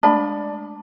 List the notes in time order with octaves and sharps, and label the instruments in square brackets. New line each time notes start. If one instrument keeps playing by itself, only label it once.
[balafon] G#3 A3 D4 [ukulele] D5 B5 [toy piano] A5